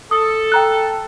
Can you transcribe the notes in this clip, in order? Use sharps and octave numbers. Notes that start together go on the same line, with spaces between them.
A4 D#6
G5 A#5 F#6